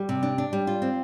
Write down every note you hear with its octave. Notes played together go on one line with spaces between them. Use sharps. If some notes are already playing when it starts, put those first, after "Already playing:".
Already playing: G3
C3
D4
D4
G3
F4
C4